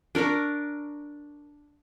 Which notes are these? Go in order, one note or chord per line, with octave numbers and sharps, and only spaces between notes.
D4 A#4 C#6 D6